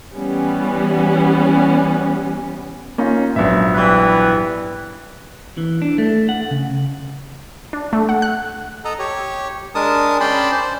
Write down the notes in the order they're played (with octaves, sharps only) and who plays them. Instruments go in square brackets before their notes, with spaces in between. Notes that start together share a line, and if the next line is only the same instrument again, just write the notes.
[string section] E3 G3 B3 C#4
[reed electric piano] A#3 [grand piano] C#4 D#4 F4
[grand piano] A#1 B3 E5 [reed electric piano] G#2 F#3
[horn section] E3 G3 B4
[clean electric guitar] E3
D4
A3
F#5
C#3
[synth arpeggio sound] D4
A3
F#5
F#6
[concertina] A4 D#5 A#5
G4 C#5
G#3 D4 A#4 A5 D#6
C#4 D5 G5 A5 B5 C6
C5 D5